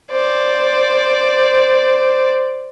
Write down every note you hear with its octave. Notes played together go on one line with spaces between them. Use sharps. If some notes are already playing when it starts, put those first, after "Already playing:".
C5 D5